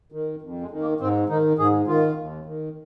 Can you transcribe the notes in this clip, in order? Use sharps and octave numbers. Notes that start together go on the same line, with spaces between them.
D#3
F2
G#3
D#3
A#3
G#2 C4
D#3 D#4
G#2 G#4
D#3 F4
D#2
D#3